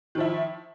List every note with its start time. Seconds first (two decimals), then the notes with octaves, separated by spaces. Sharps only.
0.15 D#3
0.18 F3
0.20 E4